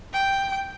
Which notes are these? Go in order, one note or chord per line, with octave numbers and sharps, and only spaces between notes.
G5